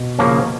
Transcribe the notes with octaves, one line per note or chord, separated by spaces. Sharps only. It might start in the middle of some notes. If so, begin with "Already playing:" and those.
Already playing: B2
C#3 F3 A#3 C#4